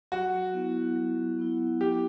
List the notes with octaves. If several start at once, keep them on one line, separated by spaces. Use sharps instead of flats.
F#3 F#4
B3 E4
F#3
B3 E4
F#3 G4